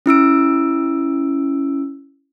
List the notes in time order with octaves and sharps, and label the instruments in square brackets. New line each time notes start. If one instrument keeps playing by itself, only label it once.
[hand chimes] C#4 E4 E6 D7